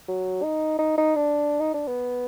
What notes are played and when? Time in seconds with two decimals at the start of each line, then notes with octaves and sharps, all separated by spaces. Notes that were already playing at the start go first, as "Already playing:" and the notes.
0.08 F#3
0.43 D#4
0.79 D#4
0.98 D#4
1.16 D4
1.60 D#4
1.74 D4
1.87 B3